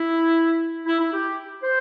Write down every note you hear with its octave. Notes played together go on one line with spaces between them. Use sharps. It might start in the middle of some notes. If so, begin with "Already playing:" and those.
Already playing: E4
E4
E4
G4
C5